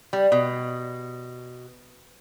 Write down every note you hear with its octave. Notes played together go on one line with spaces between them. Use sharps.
G3
B2